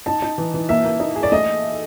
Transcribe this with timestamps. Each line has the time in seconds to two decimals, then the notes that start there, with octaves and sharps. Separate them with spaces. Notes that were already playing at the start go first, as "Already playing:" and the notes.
0.06 D#4 A5
0.22 D#4
0.38 E3
0.54 E3
0.69 A#3 E5
0.85 A#3
1.00 D#4
1.16 G#4
1.23 D5
1.32 A3 D#5